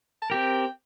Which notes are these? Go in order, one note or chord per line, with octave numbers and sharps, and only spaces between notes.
A5
C4 G4 A#4 G5